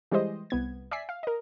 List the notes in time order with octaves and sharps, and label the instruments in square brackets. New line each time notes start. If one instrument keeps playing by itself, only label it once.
[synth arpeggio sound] E3 G3 G#3 G4 C5 D#5
C2 B3 G#6
D5 E5 G#5 B6 C7
F5
A#4 D#5